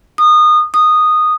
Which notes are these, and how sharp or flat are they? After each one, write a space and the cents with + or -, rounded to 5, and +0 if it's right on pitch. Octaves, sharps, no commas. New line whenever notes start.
D#6 -25
D#6 -10